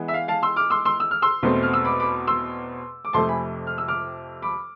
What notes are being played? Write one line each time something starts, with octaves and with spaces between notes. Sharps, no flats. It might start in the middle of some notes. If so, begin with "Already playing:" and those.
Already playing: E3 G#3 B3
E5
F5
F5 A5
C6 E6
D6 F6
C6 E6
C6 E6
E6
F6
C6 E6
E2 B2 A3 C4
F6
E6
B5 D6
B5 D6
C6 E6
D6
F2 C3 F3 A3 A5 C6
G#5 B5
F6
E6
D6 F6
B5 D6